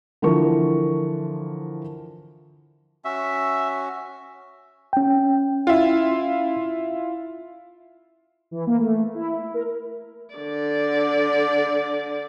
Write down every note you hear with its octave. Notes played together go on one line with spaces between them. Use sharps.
D3 E3 F3 A#4 C#6
C#4 F#4 E5
C#4 G5
E4 F4
E3
A#3
A3
E4
A#4
D3 D5